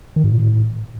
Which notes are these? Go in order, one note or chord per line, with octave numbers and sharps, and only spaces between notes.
D#3
G#2
A#2
A2